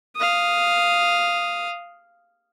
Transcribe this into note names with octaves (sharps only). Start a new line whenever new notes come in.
F5 D#6